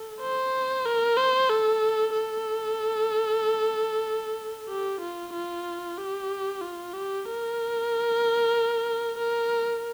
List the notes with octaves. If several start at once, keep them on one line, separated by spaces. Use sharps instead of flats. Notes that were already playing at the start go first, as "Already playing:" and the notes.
Already playing: A4
C5
A#4
C5
A4
A4
G4
F4
F4
G4
F4
G4
A#4
A#4